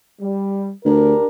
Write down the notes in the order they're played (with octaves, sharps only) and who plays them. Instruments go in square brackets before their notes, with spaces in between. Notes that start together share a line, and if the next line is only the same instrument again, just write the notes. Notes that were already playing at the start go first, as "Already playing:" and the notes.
[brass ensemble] G3
[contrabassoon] D2 [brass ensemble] D4 G4 A#4